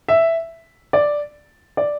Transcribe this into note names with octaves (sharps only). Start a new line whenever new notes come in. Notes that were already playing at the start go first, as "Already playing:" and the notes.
E5
D5
D5